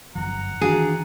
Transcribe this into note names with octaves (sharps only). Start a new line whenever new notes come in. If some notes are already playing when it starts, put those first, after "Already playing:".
G1 F#2 F3 F#5 A#5
D#3 E3 D4 F4 F#4 G#4